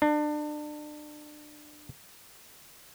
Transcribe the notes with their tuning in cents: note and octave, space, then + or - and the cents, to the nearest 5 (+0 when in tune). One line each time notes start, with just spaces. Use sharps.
D4 +30